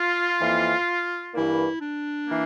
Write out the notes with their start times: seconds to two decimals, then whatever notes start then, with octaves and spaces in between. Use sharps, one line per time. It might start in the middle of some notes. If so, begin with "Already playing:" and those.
Already playing: F4
0.40 F2 E3 A#3
1.33 G2 E3 A#3 E4
1.81 D4
2.28 E3 A#3